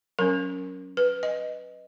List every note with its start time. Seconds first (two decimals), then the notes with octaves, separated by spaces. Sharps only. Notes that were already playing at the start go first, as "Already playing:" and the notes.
0.19 F#3 C#4 A#4
0.97 B4
1.23 D#5